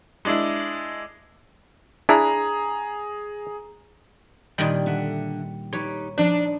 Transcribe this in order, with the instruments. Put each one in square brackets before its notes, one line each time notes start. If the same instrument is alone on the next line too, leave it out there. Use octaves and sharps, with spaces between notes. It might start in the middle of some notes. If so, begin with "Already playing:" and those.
[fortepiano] G#3 D4 E4
[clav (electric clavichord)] D4 E4 [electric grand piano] G#4 A#5
[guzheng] A#2 D#3 G3
[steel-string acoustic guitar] D3 E5 F#5
[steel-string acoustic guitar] D#4 G4 B4 [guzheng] C#5
[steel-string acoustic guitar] F3 D#4 [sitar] D4